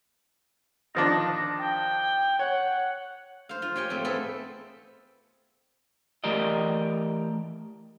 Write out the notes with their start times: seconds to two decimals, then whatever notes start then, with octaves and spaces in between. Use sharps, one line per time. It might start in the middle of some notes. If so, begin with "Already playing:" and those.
0.95 D#3 F3 D4 A#6
1.59 G5
2.39 C#5 F#5
3.49 C5 F5
3.62 F4
3.76 G4 C#5 G5 G#5
3.90 A3 C4
4.04 A3 B3 C4 G#4 A4 E5
6.24 E3 A3 G4 A#4 D5 D#5